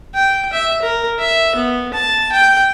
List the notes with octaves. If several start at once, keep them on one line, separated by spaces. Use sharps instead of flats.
G5
E5
A#4
E5
B3
A5
G5